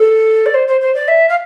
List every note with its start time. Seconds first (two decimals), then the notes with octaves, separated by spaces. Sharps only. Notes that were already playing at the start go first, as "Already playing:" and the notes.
Already playing: A4
0.46 D5
0.54 C5
0.68 C5
0.81 C5
0.95 D5
1.08 E5
1.29 F5